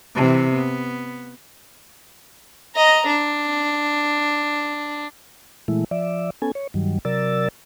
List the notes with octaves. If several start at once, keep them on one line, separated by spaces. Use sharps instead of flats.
C3 E3
B3
D#5 A#5
D4
A#2 E3 G#3 A3 E4
F3 D5 E5
B3 C#4 A4 G#5
C#5
G2 D#3 F#3 G3
C3 F#3 A#4 D5 E6 A6